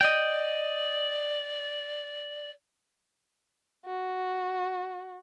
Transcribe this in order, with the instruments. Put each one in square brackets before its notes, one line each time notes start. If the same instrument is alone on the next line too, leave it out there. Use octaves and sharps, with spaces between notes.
[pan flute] D5 [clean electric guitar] D#5 G5
[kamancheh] F#4